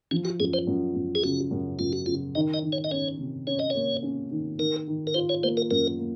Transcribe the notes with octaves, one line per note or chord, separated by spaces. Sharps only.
F3 C#4
F#4
F#2 G#4
C5
F#2
F#2
G#4
C#3 F#4
F#2
F#2 F4
F#4
C#3 F4
D#3 D#5
D#5
D#3
C#5
D#5
C#4 C#5
C3
C#4 C#5
D#5
A#3 C#5
C#4
D#3
D#3 A#4
D#3
A#4
F4 C5
C#5
A#3 C5
A#4
F#2 A#4
A#3